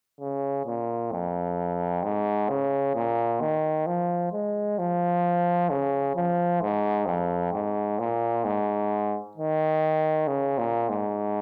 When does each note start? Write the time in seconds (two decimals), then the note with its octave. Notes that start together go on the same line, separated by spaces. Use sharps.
0.21 C#3
0.66 A#2
1.12 F2
2.03 G#2
2.49 C#3
2.95 A#2
3.41 D#3
3.87 F3
4.32 G#3
4.79 F3
5.70 C#3
6.16 F3
6.62 G#2
7.07 F2
7.53 G#2
7.99 A#2
8.45 G#2
9.37 D#3
10.28 C#3
10.58 A#2
10.89 G#2